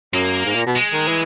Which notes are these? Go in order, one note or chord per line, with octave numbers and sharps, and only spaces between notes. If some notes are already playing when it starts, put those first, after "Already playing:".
F#2 A#3
G#2
A#2
B2
G#3
D#3
E3